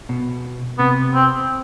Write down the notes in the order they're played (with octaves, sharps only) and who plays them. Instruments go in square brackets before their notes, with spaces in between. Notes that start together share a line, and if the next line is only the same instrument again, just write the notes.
[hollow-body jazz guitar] B2
[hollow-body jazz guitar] C3 [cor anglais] B3
[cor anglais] C4